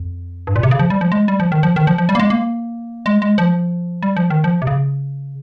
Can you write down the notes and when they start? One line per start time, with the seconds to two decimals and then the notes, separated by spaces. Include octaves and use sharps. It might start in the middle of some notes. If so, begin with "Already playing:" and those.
Already playing: F2
0.47 G2
0.56 A#2
0.63 C3
0.71 C#3
0.79 F3
0.90 G3
1.01 F3
1.12 G#3
1.28 G3
1.40 F3
1.52 D#3
1.63 F3
1.76 D#3
1.87 F3
1.98 F3
2.09 G3
2.15 A#3
2.20 G#3
2.30 A#3
3.06 G#3
3.22 G#3
3.38 F3
4.03 G3
4.17 F3
4.30 D#3
4.44 F3
4.62 C3
4.67 C#3